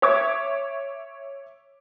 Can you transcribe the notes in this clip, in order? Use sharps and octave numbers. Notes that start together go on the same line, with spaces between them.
C#5 E5 C#6 D6 G#6